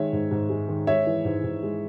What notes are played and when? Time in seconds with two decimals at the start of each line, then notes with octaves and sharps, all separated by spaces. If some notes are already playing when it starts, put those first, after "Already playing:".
Already playing: D#3 G#3 C#5 E5
0.13 G#2
0.31 G#2
0.50 G#3
0.69 D#3
0.87 G#3 C#5 E5
1.07 E3
1.25 G#2
1.44 G#2
1.63 G#3